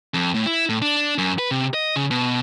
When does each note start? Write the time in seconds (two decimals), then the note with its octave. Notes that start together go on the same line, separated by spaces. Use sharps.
0.14 F2
0.34 A2
0.46 E4
0.69 A2
0.82 D4
1.18 F#2
1.39 B4
1.51 C3
1.74 D#5
1.96 C#3
2.11 B2